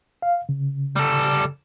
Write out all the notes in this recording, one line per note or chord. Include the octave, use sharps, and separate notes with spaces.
F5
C#3
G3 A4